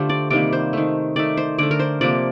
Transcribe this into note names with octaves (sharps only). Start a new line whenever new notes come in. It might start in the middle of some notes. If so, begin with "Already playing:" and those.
Already playing: D3 A3 F4 G4 C5
D5
C3 D#3 G3 A#3 D5
C5
D#3 A3
D#3 A3 D5
C5
D3 A3 D5
A#4
C5
C3 F3 A#3 D5